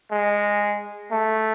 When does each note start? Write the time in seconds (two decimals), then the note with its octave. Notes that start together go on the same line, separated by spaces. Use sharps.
0.11 G#3
1.11 A3